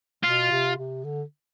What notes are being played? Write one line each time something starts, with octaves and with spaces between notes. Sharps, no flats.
B2 F4
C3
C3
D3